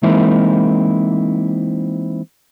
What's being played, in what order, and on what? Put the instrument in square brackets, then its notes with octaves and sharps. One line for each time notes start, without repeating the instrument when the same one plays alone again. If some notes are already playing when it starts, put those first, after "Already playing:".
[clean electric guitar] E3 G#3 A#3 C4 D#4 E4